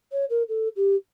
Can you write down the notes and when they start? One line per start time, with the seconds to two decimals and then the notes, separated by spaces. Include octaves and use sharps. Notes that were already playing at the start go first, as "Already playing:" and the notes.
0.11 C#5
0.29 A#4
0.48 A4
0.76 G4